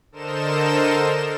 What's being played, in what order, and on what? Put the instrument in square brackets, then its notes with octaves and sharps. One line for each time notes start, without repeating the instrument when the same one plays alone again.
[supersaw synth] D3 A4 A#4 C5 D#5 E7